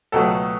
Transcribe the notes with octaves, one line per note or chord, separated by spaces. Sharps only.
C#2 B2 F#3 A3 A4